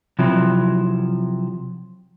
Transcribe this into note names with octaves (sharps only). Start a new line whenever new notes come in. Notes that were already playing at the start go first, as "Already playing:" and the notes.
C3 F3 F#3 E4